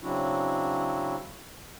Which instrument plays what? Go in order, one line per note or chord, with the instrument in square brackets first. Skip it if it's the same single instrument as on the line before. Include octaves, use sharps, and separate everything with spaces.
[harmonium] C#3 F#3 C4 D4 E4 F#4